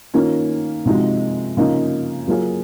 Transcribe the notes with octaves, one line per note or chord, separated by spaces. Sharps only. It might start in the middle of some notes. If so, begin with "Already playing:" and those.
D#3 A#3 C#4 F4
C3 F3 G#3 D#4 F#4
C#3 F3 A#3 D#4
F#3 A#3 F4 G#4